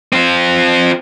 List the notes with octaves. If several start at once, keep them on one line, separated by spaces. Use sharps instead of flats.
C4 F4